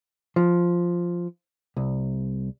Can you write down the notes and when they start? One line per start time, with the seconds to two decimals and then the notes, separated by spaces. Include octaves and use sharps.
0.36 F3
1.77 C2